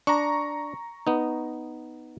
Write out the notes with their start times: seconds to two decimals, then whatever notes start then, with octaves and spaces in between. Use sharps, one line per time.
0.07 D4 A#5 C#6
1.07 B3 D#4